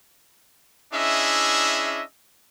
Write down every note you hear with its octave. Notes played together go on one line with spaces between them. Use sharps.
C#4 D4 E4 G#4 D#5 E5